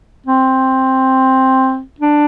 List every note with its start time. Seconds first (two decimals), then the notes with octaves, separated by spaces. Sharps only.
0.26 C4
2.00 D4